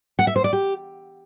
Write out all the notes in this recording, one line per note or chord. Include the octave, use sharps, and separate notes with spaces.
F#5
E5
C5
D5
G4